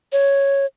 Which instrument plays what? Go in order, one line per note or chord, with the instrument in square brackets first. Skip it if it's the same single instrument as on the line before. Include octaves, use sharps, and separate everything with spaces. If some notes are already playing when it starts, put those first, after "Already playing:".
[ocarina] C#5